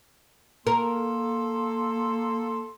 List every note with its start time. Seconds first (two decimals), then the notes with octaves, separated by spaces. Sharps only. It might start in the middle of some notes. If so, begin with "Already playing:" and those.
0.67 A#3 A4 A#4 C6